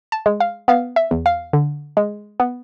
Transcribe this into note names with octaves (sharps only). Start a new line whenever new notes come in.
A5
G#3
F5
B3 F5
E5
E2
F5
D3
G#3
B3